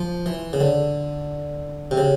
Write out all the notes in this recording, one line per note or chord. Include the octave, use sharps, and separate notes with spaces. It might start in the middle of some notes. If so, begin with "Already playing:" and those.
Already playing: F3
E3
C#3
D3
C3
C#3